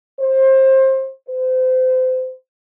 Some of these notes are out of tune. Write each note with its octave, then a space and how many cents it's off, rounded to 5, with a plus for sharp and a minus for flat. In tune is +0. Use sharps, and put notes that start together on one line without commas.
C5 +25
C5 -30